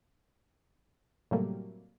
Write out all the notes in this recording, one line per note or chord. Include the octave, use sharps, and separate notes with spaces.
A2 C3 F#3 G3 A3 A#3